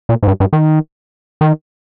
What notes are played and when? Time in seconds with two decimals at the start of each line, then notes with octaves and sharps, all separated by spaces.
0.09 A#2
0.23 G#2
0.28 G2
0.40 G2
0.53 D#3
1.41 D#3